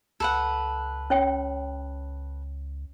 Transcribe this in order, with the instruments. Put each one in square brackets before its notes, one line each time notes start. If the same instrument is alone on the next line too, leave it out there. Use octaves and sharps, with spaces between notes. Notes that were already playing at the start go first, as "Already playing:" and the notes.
[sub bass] C#2 [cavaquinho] A4 B4 F#5
[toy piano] C#4 C#5 G5